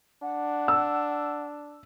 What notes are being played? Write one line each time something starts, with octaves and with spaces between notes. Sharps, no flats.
D4 F#5
E6